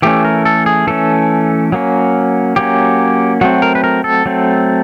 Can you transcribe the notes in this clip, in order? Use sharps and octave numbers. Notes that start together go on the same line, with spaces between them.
E3 A3 C#4 G4
A#4
A4
G#4
E3 A3 C#4 A4
F#3 A#3 C#4
F#3 A#3 C#4 G4
F#3 A3 C4 F#4
A#4
B4
A#4
A4
F#3 A3 C4